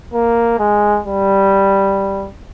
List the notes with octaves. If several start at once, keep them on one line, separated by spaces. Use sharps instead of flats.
A#3
G#3
G3